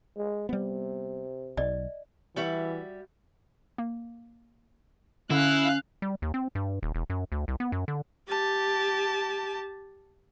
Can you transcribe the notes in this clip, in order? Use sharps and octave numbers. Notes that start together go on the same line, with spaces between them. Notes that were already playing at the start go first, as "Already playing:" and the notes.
G#3
C3 G3 B3
B1 D5 D#5
E3 G3 F#4 E5
A#3
D3 C#4 E4 F5 F#6
G3
D#2
C4
G2
D#1
E1
F#2
D2
C2
B3
F#2
D3
G4 A5